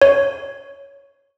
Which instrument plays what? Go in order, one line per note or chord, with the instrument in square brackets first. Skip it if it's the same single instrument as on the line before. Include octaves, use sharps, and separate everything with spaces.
[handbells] C#5